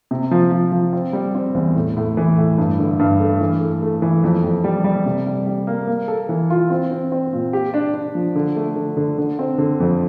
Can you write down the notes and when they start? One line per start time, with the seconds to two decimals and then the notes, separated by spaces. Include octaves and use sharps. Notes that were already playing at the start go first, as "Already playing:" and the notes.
0.11 C3
0.31 F3
0.51 F3
0.72 F3
0.93 C4
1.13 G3
1.35 C4
1.55 E2
1.76 A2
1.97 A2
2.17 E3
2.38 A2
2.58 G2
2.79 D3
2.99 G2
3.20 A3
3.41 E3
3.60 A3
3.82 A3
4.02 E3
4.23 F2
4.44 F2
4.64 G3
4.84 G3
5.05 C3
5.27 G3
5.47 G3
5.67 A#3
5.87 A#3
6.08 A4
6.29 E3
6.50 F4
6.70 C4
6.91 C4
7.12 C4
7.33 A#2
7.53 G4
7.74 D4
7.94 D4
8.15 F3
8.35 D3
8.56 A3
8.76 D3
8.97 D3
9.18 D3
9.39 C4
9.58 D3
9.80 F2